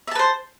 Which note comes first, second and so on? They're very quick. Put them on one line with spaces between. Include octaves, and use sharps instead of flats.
E5 A5 B4 C5